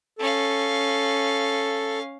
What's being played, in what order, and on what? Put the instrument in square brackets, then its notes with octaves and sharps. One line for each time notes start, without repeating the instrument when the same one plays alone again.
[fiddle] C#4 F5 [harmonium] A4